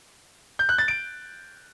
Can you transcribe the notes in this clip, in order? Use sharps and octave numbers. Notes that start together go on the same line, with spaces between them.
G6
F#6
A6
D7